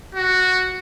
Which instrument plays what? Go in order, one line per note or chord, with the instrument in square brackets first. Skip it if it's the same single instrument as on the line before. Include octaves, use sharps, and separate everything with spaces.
[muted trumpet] F#4